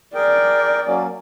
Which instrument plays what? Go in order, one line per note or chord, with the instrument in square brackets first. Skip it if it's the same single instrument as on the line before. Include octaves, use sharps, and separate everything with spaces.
[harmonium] G#4 A#4 G5 [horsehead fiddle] D5
[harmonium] F#3 A#3 C#4